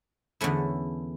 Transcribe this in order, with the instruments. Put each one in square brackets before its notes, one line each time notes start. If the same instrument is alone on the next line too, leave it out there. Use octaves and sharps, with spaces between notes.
[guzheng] E2 D3 A3 C#4 E4